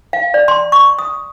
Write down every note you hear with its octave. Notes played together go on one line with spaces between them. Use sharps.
F5
D5
C6
C#6
D#6